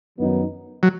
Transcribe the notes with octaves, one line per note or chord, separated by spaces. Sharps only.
F#2 D#3 F#3 B3 D#4
F#3